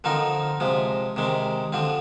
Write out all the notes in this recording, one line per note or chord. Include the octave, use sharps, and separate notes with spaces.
D3 F3 C4 D#4 A#4
C3 F3 G#3
C3 D#3 G#3
D3 F3 C4